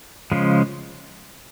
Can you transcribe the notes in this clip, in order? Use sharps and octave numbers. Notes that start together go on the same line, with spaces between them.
C#3 F3 G#3